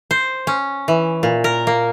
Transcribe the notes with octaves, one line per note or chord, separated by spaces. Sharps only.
C5
C#4
E3
A#2
A#4
A#3